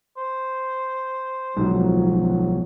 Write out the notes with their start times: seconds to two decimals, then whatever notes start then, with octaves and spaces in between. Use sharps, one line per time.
0.17 C5
1.57 D1 B1 G#2 F3 F#3